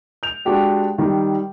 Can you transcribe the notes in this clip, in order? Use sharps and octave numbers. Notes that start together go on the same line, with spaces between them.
G6 F7
G#3 D4 F#4 G4 G5
D#3 G3